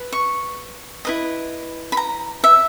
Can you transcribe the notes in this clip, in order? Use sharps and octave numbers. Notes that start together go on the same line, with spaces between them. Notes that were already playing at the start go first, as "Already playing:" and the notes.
Already playing: B4
C#6
E4 B4 D#5
B5
A#5
E5